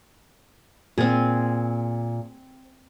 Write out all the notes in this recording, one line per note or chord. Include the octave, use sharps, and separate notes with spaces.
A#2 C4 G#4